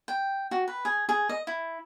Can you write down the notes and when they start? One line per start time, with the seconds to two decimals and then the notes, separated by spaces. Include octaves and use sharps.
0.08 G5
0.51 F#4
0.68 B4
0.85 G#4
1.09 G#4
1.29 D#5
1.47 E4